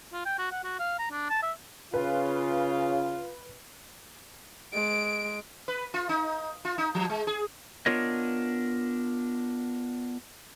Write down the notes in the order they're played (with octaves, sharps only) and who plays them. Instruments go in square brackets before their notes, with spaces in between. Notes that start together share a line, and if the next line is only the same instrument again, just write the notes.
[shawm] F4
G5
F#4
F#5
F#4
F5
A#5
D4
A5
E5
[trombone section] C#3 [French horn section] F4 [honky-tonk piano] B4
[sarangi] G#3 [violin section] D7
[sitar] B4
F4
D#4
F4
D#4
F3
G#3
G#4
[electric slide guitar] B3 D4 F4 A#4 C#5 D#5